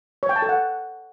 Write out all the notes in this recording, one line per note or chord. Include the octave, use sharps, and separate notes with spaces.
C#5
G5
A5
A4
F#5